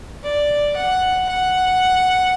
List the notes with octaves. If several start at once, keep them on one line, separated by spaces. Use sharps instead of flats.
D5
F#5
F#5